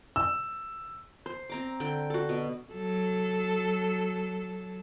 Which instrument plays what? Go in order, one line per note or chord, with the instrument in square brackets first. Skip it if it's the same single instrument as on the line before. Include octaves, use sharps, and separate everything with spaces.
[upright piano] E6
[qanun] C5
C4 A#5 D6
D3 G5
F#4 A4
B2
[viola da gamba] F#3 A4